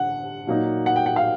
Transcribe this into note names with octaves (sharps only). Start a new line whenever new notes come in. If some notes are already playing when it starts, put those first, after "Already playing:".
Already playing: D3 F#5
A#2 F#3 A#3 D#4
F#5
G5
F#5
F5